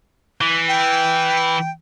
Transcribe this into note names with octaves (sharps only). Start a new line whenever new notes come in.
E3
G5